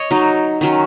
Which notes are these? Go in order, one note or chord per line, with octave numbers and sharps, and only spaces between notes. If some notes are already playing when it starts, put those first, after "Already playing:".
Already playing: C#5 D#5
F#3 D#4
D#3 F#3 C#4